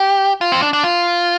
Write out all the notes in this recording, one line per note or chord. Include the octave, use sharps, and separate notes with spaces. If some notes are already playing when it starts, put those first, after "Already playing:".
Already playing: G4
F4
C4
D4
D4
F4